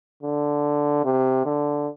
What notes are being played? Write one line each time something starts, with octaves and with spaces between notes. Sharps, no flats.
D3
C3
D3